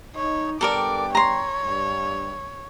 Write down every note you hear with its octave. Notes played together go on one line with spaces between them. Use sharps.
D#4 C#5
G2 B3 A4 A#4 D5 G5 D6
C#5 A#5 C6
G2